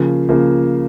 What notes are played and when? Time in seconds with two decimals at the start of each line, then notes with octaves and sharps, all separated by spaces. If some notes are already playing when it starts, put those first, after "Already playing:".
Already playing: C#3 F3 A#3
0.29 C#3 F3 A#3